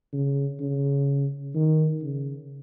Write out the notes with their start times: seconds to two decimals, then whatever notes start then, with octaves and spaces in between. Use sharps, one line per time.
0.13 C#3
0.60 C#3
1.55 D#3
2.02 C#3